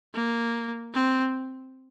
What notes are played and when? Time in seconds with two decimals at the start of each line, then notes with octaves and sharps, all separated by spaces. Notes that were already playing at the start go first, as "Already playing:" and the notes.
0.15 A#3
0.94 C4